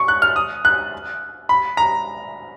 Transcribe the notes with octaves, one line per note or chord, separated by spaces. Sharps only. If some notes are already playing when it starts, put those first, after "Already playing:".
Already playing: C#6
F#6
F6
D#6
F#6
B5
A#5